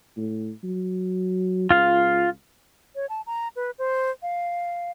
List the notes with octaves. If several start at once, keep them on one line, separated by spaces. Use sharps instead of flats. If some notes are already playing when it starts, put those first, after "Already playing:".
A2
F#3
C#2 F4 F5
C#5
A5
A#5
B4
C5
F5